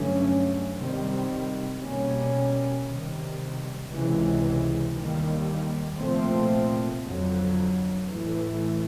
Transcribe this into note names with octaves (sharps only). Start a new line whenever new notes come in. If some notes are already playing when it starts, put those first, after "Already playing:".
Already playing: G2 D3 F#3 A3 C#4
C3 D#3 G3 C4
B2 G3 A#3 C#4
C3 D#3 G3
C#2 C3 E3 G#3
D#2 D#3 G3 A#3
C2 A#2 F3 A3 C4
F2 D3 F#3
A2 E3 A3